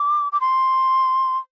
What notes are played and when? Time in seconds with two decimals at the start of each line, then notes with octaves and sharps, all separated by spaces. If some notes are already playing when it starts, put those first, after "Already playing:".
Already playing: D6
0.32 D6
0.41 C6